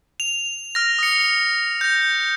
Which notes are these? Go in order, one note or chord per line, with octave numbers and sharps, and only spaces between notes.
F7
F6 A#6
D#6 C#7
G6 A#6